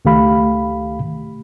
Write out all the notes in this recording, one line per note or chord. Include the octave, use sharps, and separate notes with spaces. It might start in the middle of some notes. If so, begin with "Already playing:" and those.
C#2 D#3 A3 G4 F5 B5